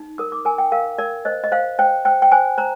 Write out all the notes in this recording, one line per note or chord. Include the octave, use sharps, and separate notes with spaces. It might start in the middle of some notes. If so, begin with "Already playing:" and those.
Already playing: D#4
A#4 D#6
D6
A#4 G#5
G5
A#4 F5
A#4 D5
C5 D#5
D#5
C5 F5
C5 G5
C5 G5
G5
C5 G#5
C5 A#5